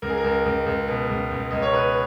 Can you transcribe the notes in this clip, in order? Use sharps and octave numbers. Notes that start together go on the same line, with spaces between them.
C#2 A#4
G#4
A#4
C#2
C#2
C#2
B2
C#2
C#2
C#2 D#5
C#5
B2 B4